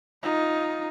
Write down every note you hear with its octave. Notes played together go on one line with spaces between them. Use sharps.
D#4 F4